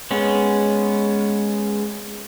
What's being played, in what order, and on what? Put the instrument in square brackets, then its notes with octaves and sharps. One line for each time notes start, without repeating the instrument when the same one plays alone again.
[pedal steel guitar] G#3 B3 C#4